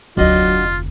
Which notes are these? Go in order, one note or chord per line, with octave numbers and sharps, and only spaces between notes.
F1 D2 F#3 D4 F4 F#4 D#5